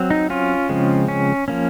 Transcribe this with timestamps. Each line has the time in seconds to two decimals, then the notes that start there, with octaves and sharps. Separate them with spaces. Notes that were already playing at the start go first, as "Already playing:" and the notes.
Already playing: F#3 C4
0.10 D#4
0.30 C#4 F4
0.69 C#3 F3 G#3 C4
1.08 C#4
1.48 F3 A#3 C#4